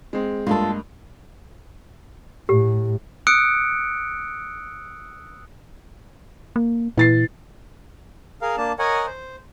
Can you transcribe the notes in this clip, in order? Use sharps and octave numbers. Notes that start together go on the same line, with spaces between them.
G#3 C4
G2 G#3 A#3 F4 A4
A2 G4
D#6 E6 F#6 C#7 D7
A#3
A#2 E3 A6 C7
G#4 A#4 F5
A#3 D4 A5
A#4 C#5 D#5 F#5 G#5
C5